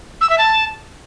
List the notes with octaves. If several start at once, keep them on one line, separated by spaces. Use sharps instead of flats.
E6
E5
A5